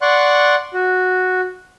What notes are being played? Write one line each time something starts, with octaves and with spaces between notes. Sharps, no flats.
D5 F#5 C6 C#6 F#6
F#4